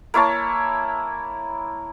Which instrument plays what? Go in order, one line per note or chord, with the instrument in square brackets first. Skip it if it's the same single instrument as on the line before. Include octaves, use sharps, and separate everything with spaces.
[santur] A#3 E4 C#5 A5